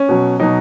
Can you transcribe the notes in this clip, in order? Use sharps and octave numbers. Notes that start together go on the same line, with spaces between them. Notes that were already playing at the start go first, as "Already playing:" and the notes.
Already playing: C#4
B2 F#3
B2 F#3 D#4